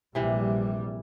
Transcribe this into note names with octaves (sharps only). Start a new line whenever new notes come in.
A#1 C3 E3 G3